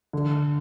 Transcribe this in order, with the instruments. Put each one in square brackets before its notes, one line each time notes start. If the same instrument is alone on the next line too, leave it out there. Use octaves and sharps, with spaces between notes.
[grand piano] D3